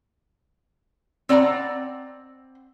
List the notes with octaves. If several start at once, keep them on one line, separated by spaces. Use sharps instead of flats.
C4 D5 F#5 A5 A#5